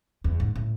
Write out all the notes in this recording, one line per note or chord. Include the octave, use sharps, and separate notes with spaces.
E2
G#2
A2